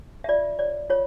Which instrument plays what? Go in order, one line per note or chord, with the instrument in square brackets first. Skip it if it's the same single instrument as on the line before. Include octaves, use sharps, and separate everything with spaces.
[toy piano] E5
F4 D5
C#5 D5
F4 C#5